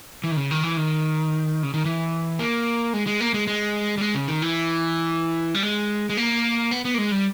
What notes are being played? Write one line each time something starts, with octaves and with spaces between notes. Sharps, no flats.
E3
D#3
C#3
D#3
E3
D#3
C#3
D#3
E3
A#3
G#3
G#3
A#3
G#3
G#3
G3
G#3
C#3
D#3
E3
G3
G#3
G#3
A#3
B3
B3
A#3
G#3
G3